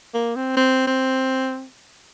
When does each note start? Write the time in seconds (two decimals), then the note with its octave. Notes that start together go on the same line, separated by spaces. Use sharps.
0.14 A#3
0.36 C4
0.57 C4
0.87 C4